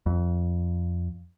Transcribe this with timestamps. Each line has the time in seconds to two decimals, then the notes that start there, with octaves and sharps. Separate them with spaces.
0.06 F2